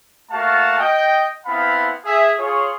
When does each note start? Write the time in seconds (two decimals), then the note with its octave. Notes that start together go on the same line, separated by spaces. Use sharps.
0.31 A3 A#3 F#4 F5 A5
0.79 D#5 G5
1.46 B3 C4 E4 F5 A5 B5
2.05 G#4 E5
2.39 F4 G#4 C#5